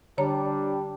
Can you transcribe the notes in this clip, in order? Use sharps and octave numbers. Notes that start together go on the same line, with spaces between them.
D3 G3 D4 C#5 A#5